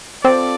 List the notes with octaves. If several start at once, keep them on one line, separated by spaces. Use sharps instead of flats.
C4 F4 A4 D5